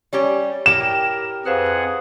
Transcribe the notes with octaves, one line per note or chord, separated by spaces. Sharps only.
G3 C#4 G4 C#5
E4 G4 A#4 G5 E7
F2 G#4 B4 C5 F5 F#5